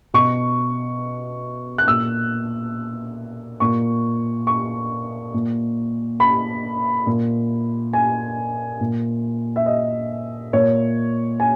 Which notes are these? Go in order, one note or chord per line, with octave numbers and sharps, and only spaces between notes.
B2 C#6
F#6
A#2 E6
A#2 C#6
C#6
A#2
B5
A#2
G#5
A#2
E5
D#5
A#2 C#5
G#5